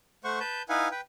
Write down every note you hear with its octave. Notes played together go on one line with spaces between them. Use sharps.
A3 C5 F#5 C#6
B4 A5 G6
D#4 E4 B4 F5 F#5 G#5
B4 G5